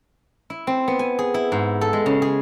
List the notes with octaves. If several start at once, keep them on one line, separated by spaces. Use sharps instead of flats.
E4
C4
B3
G#5
G#4
E4
G#2
A4
G#3
C#3
G#4